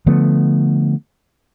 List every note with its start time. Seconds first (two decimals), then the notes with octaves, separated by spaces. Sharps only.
0.06 D3 F3 A3 B3